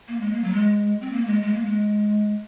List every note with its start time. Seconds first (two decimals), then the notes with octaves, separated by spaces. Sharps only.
0.08 A#3
0.21 G#3
0.33 A#3
0.44 F#3
0.53 G#3
1.01 C4
1.12 A#3
1.27 G#3
1.42 G#3
1.54 A#3
1.65 G#3